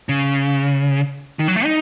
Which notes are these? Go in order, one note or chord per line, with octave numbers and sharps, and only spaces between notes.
C#3
D#3
F#3
A3
D#4